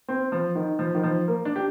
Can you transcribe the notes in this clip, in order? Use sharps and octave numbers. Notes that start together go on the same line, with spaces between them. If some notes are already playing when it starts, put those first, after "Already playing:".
C4
F3
D#3
F3
D#3
F3
A#3
D4
G4